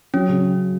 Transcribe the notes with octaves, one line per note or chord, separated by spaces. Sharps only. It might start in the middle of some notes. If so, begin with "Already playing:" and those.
F#3 C#4
C#3